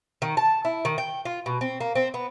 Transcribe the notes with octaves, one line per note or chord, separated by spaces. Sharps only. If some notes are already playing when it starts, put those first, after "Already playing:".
D#3
A5
E4
D#3
G5
F4
B2
C4
A#3
C4
B3